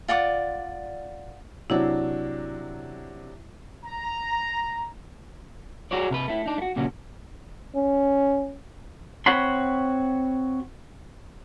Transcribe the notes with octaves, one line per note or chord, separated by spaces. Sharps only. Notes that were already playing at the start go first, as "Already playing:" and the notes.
F4 D5 F#5 D6
C3 F#3 D4 E4
A#5
F#4 G#4 C#5 D5
C3 A#4 B4
A3 E4
D4 D#4
A3 F#4
A#2 C#3 A#3 C#4 F#4
C#4
C4 F#4 C#5 F#5 B5 C6